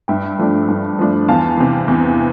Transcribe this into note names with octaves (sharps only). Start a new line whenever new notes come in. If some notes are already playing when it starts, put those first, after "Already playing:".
G2 E5 G5
F3 A3 D4
G2
F3 A3 D4
E2 F5 A5
C3 E3
E2